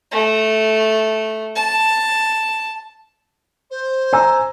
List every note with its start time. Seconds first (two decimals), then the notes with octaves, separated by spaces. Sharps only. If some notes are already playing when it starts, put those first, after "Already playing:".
0.12 A3
1.55 A5
3.70 C5
4.13 G#5 A#5 E6